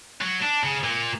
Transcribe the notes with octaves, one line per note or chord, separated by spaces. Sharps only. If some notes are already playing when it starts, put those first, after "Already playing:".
F#3
D4
C#3
A#2